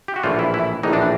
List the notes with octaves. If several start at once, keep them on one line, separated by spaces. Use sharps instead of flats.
G4
F#4
A#1 A2 E3 F4
E4
E4
A#1 A2 E3 D#4
D4